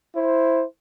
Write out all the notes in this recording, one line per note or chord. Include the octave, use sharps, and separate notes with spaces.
E4 C5